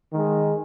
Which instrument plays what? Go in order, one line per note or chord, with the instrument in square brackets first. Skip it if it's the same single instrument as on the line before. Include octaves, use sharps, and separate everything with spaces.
[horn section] D#3 G#3